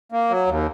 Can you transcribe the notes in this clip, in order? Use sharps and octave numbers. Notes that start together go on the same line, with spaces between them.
A#3
F#3
D#2